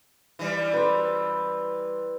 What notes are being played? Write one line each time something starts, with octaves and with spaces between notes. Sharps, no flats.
E3 G3
B4 C5